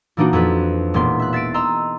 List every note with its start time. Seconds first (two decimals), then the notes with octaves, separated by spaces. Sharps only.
0.17 A#2 E3 A#3 D4 D#4 F#4
0.33 F2 B4
0.94 E1 A#2 A#3 B3 C6 C7
1.19 E5 F#6
1.33 E5 A6 C7 D7
1.54 D#5 A#5 C6 E6